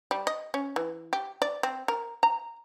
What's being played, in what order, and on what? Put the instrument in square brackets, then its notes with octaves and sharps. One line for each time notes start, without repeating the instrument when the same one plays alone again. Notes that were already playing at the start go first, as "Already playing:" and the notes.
[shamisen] G3
D#5
C#4
E3
G4
D5
C4
A#4
A#5